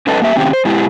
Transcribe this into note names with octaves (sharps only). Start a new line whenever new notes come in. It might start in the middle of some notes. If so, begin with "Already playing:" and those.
G#2 C#4 A4 B4 D#5 A5
A#3 G4 E5
A2 C3 D#3 C4 C#4 G4
C5
B2 G#3 E4 G4